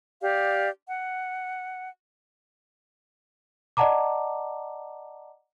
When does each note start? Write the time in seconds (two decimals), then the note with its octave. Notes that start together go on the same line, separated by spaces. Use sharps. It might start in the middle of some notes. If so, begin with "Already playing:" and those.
0.21 G4 D5 F5
0.88 F#5
3.77 D5 D#5 F#5 A5 A#5 D6